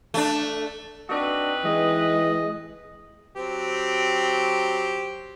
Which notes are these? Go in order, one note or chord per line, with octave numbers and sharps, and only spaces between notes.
A3 D4
C4 D4 D#4 F#4 B4
E3 G#3 D#5
F#3 C4 G4